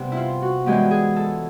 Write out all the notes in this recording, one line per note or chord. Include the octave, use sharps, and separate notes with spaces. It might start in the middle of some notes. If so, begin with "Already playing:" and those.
Already playing: G2 C3 B3
E4
F4
F#4
G2 E3 G#3 B3 G4
G#4
A4